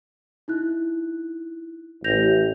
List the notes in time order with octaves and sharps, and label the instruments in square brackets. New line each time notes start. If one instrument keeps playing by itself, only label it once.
[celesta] D#4 E4 F#6
[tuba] A1 [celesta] G6 A#6 F7